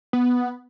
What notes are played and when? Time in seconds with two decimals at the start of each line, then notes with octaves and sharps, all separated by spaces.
0.13 B3